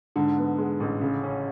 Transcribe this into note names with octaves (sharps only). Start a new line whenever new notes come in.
G#2 D3
B3
G#3
A1
C#3
C#4